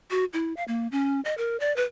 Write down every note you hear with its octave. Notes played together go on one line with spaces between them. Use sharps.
F#4
E4
F5
A#3
C#4
D#5
A#4
D5
B4